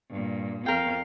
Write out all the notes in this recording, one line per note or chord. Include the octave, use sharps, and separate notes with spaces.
G2 A#2
F2 A#4 F5 G5